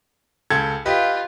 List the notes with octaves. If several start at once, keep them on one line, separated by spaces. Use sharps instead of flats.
C#2 A4 G#6
F4 G4 B4 D#5